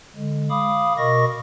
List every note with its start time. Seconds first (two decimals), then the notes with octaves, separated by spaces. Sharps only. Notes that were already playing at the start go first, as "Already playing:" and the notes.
0.16 D3 G#3
0.50 F5 B5 D6 D#6
0.98 B2 A#4 D#5 C#6 A#6